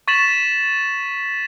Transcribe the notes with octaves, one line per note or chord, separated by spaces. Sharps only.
C#6 A6 B6 E7 F#7